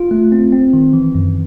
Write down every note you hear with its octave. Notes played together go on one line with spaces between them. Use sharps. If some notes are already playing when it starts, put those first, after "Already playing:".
Already playing: F4
A3
C4
C4
D#3
E3
F#2